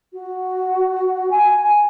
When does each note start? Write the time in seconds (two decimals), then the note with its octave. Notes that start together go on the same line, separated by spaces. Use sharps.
0.13 F#4
1.31 G#5